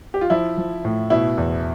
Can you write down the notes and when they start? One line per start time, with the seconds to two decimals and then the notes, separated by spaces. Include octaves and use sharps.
0.14 G4
0.21 F4
0.30 F3 E4
0.57 F3
0.85 A2
1.10 B2 E4
1.38 E2